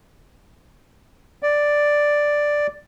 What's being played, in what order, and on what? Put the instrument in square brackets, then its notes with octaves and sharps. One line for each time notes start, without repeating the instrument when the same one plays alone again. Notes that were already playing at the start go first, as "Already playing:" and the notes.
[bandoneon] D5